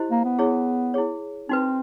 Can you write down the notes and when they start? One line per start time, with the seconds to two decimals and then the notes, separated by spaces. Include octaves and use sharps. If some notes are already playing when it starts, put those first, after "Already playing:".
Already playing: E4 G4 C5 D#5
0.11 A#3
0.24 B3
0.39 E4 G#4 C#5
0.94 E4 G#4 C#5
1.49 C4 D#4 F#4 B4